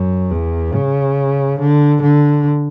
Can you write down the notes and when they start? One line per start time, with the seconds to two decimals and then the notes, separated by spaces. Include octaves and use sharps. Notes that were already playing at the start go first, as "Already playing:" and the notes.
Already playing: F#2
0.31 E2
0.74 C#3
1.59 D3
2.02 D3